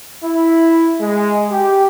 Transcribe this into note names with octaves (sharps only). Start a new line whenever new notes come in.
E4
G#3
G4